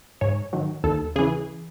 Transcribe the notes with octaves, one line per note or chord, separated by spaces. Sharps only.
G#2 C#5
D#3 F#3
D#2 A4
C#3 E3 G#4